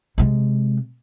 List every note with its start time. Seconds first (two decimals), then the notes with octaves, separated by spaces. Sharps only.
0.18 C3 G#3